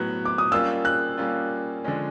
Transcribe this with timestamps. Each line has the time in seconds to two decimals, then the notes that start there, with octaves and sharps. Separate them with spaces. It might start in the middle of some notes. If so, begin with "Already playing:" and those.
Already playing: A2 F#3 B3 F#6
0.25 D6
0.38 D#6
0.52 G3 A#3 C#4 F4 E6
0.85 F#6
1.17 G3 A#3 C#4 F4
1.84 D3 F3 G#3 C#4